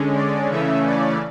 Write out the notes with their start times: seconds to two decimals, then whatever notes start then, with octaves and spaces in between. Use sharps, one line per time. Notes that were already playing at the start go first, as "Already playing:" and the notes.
Already playing: D3 G#3 C#4
0.15 D5
0.49 C#3 E3 A3 C#4 E5
0.85 D5